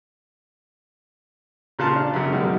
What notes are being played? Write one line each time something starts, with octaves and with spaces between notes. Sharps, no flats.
A#2 C#3 F4 A5 F6
D4
F#2 C#3
F#2 B2 D#3 G3 G#3